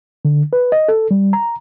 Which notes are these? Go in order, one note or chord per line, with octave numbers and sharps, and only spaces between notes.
D3
B4
D#5
A4
G3
A#5